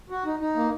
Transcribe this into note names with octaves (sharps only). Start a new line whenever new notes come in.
F#4
D#4
D#4
A#3